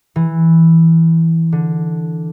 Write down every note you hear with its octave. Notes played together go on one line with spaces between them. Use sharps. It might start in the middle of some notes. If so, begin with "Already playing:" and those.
E3
D3